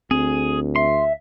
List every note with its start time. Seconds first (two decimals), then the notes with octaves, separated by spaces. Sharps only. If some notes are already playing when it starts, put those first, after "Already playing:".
0.11 D2 C4 G#4
0.76 E5 C6